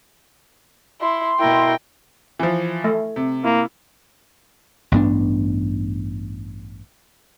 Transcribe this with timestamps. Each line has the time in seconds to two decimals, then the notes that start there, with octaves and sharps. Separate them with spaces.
1.01 E4 C6
1.40 B2 E4 A#4 G5
2.39 E3 F3
2.84 A3
3.16 C3
3.45 A#3 E4
4.92 A1 G2 B3 D4